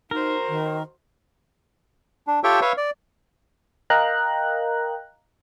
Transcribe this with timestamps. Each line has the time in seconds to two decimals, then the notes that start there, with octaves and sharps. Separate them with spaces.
0.11 D#4 F#4 A#4 C5
0.49 D#3
2.27 D4
2.44 F4 G4 A4 C#5 E5 G5
2.61 B4 C#5 E5 F5
2.77 D5
3.90 A#4 D#5 F5 G5 A#5 F#6